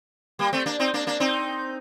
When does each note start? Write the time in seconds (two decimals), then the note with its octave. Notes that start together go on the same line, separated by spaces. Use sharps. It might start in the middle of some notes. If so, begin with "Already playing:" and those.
0.39 G3 A#3
0.53 A3 C4
0.66 A#3 D4
0.79 C4 D#4
0.94 A#3 D4
1.07 A#3 D4
1.20 C4 D#4